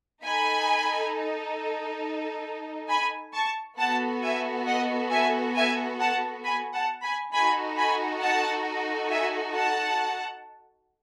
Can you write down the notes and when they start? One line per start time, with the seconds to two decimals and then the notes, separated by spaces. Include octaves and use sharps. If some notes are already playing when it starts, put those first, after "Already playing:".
0.23 D#4 A4 G#5 B5
2.89 G#5 B5
3.34 A5 C#6
3.78 B3 F#4 A4 F#5 A5
4.22 E5 G#5
4.66 D#5 F#5
5.11 E5 G#5
5.56 E5 G#5
6.00 F#5 A5
6.44 G#5 B5
6.74 F#5 A5
7.03 G#5 B5
7.33 D#4 F#4 A4 G#5 B5
7.77 G#5 B5
8.22 F#5 A5
9.10 E5 G#5
9.55 F#5 A5